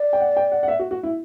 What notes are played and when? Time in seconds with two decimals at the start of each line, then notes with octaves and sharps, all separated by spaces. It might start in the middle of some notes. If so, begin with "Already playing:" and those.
Already playing: D5
0.13 G5
0.20 F#5
0.37 G5
0.52 F#5
0.63 F#5
0.68 E5
0.79 F#4
0.91 F#4
1.03 E4